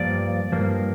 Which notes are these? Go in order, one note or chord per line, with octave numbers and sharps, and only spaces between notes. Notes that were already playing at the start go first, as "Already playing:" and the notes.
Already playing: G2 F3 A#3 D5
G2 F3 A#3